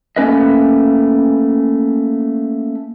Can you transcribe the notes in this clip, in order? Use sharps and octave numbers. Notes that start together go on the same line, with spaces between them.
A3 A#3 C#4 B4 D#5